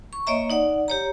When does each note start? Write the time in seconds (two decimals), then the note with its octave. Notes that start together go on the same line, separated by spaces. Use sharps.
0.13 C#6
0.27 A#3 C#5 D#5 E5 A#5
0.50 D#4 D5 F#5
0.88 G4 C#5 A#5